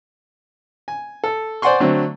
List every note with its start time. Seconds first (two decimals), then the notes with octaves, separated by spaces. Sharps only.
0.88 G#5
1.24 A4
1.62 C5 D5 F#5 G#5 C6 C#6
1.80 D3 F#3 A3 C4